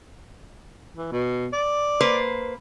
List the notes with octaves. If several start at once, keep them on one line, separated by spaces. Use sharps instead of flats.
E3
B2
D5
A#3 B4 C5